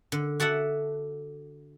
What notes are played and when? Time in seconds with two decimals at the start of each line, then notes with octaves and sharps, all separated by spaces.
0.12 D3
0.40 F#4 A4 D5 E5 F#5